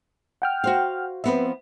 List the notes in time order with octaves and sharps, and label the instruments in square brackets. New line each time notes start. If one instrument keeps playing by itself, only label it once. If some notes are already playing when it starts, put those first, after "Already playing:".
[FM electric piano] F#5 G5 F6
[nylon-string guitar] F#4 C5 F5
[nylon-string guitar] F3 B3 C4 [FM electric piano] B4 E5